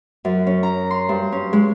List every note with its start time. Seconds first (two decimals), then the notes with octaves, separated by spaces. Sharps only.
0.25 F#2
0.47 C#4
0.63 A#5
0.91 C6
1.09 G2
1.32 C#4
1.53 G#3